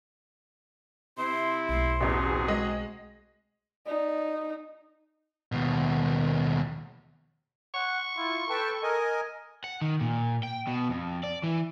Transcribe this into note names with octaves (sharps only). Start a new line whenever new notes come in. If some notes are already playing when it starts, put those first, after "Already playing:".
C3 C4 E4 C6
B1 A3 C6
A1 E2 C4 F#4 G#4
G#3 D#5
D#4 D5
D#2 B2
F#5 C#6
E4 F4
A4 B4 G5 A5
A#4 D#5 G#5
F#5
D#3
A#2
G5
B2
F2
D5
E3